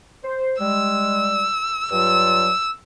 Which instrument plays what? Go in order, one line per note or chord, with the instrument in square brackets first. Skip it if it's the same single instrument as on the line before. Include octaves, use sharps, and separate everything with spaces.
[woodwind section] C5
[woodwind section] G3 G#3 [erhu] E6
[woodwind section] G2 F#3 F4 [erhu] E6